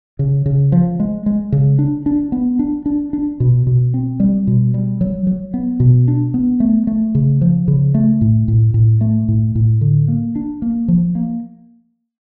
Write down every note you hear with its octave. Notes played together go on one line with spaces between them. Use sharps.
C#3
C#3
F3
G#3
G#3
C#3
D4
D4
B3
D4
D4
D4
B2
B2
C4
G3
B2
G3
F#3
F#3
B3
B2
D4
B3
A3
A3
C#3
F3
C#3
A3
A2
A2
A2
A3
A2
A2
D3
A#3
D4
A#3
F3
A#3